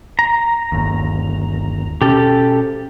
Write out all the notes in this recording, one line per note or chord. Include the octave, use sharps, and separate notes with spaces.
A#5
G1 D#2
B2 C#4 G4 A4